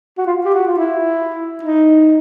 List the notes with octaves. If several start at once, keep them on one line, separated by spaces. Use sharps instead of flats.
F#4
F4
G4
F#4
F4
E4
D#4